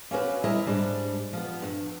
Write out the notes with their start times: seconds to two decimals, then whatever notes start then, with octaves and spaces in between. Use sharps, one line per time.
0.11 A#3 C#4 F#4 B4
0.44 G3 E4 D#5 E5 A#5
0.66 G#2 G3 D4
1.33 F3 B3
1.62 G2